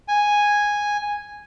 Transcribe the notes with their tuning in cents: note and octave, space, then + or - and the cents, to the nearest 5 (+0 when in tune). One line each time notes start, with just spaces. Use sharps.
G#5 -5